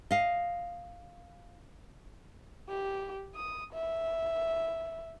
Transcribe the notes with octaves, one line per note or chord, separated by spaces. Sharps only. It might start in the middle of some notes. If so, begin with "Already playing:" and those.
D#5 F5
G4
D#6
E5